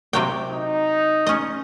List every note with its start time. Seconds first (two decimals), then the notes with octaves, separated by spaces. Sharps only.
0.13 C3 F#3 G5
0.49 D#4
1.27 C#4 D#5